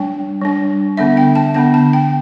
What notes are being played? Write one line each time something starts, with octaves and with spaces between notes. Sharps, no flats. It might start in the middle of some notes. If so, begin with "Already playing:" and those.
Already playing: G3 D4 G5
G3 D4
D3 B3 D4 E5
G5
A5
D3 B3 D4 A5
A5
G5